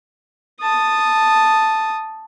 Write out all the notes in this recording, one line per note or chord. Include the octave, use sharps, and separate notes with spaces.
A5 D#6